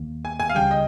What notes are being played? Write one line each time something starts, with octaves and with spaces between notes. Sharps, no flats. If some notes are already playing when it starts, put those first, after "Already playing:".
Already playing: D#2 D#3 A#3
G#5
G#5
F5
C#2 C#3 G3 G5
D#5